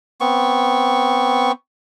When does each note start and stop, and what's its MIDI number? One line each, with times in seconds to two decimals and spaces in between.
0.21 1.52 59
0.21 1.52 60
0.21 1.52 85